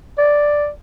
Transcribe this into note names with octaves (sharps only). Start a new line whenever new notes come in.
D5